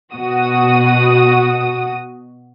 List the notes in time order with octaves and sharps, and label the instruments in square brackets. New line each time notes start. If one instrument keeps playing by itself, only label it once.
[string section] B2 F#4 D#6